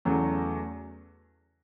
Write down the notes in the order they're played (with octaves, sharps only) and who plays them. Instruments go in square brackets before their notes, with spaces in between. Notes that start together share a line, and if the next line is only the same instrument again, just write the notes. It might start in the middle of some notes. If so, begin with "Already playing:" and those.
[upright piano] E2 C#3 F#3 A3 F#4